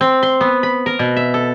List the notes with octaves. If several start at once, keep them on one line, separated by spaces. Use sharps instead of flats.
C4
C6
B3
B5
A#4
B2
E5
A4